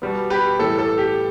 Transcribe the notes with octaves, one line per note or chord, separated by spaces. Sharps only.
B2 G3 B3
G4 B4
A2 E3 G3 A4
A4
G4